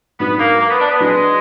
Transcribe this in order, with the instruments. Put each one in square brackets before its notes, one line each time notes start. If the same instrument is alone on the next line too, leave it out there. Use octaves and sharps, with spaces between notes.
[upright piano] G#2 F#3 D4 F#4 [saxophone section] B3
[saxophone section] A#3
A#3
B3
D4
B3
[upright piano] F#3 D4 F#4 B4 [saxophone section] G#3